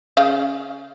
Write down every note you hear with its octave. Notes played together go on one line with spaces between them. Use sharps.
C#3 F5